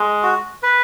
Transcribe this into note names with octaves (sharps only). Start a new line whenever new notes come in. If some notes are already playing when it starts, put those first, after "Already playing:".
Already playing: G#3
F#4
B4